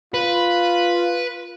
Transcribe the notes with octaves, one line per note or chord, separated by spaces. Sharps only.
F4 B4